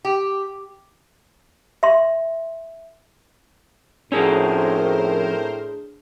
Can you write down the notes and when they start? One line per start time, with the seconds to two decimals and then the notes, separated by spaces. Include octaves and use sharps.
0.05 G4
1.83 E5 C6
4.12 F2 A2 C#4 D4 G#4 A#4 C5